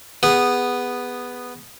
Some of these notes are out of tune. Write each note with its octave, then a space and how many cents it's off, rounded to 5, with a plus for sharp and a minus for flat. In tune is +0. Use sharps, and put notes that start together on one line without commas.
B3 +0 G#4 -20